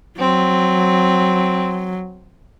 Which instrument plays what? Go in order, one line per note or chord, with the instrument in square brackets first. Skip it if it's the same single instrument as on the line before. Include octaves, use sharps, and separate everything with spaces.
[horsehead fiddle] F#3 [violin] C4